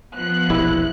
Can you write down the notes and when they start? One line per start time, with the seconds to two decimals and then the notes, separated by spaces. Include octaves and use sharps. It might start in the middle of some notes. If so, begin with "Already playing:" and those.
0.14 F3 B3 F#6
0.50 E1 A#1 G3 E4